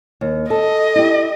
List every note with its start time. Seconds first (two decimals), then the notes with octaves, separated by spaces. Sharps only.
0.21 D#2
0.50 A4 D#5
0.96 E4 G4